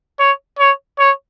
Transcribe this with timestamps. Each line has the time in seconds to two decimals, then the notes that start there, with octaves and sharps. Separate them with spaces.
0.20 C#5
0.59 C#5
0.99 C#5